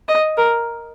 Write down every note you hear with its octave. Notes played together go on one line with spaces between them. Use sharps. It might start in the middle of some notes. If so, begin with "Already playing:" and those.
D#5
A#4